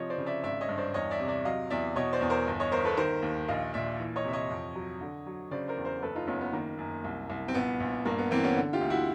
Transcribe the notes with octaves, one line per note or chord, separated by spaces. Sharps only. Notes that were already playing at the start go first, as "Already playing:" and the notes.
Already playing: C3 F3 C#5 D#5
C5 D5
C#3
D5 E5
G#1 D5 E5
C#5 D#5
G2
C5 D5
E2 C#5 D#5
D5 E5
C3
D5 E5
F#3 D#5 F5
E2 D5 E5
B2 C#5 D#5
C5 D5
E2
A#4 C5
G1
C#5 D#5
G1 A#4 C5
A4 B4
D#3 A#4 C5
D#2
A#1 D#5 F5
A#2 D5 E5
E3
C#5 D#5
C3 E5
C#5 D#5
F2
F#3
D3
F#3
C#3 C5 D5
A#4 C5
E2
A#4 C5
F#1 A4 B4
D#4 F4
F#1 B3 C#4
B3
D#3 A#3
F#2
C2
C2
C4
A#1 B3
A#1
G2 A#3
B3
E3 A#3 C4
B3 C#4
D3
F4 G4
D2
E4 F#4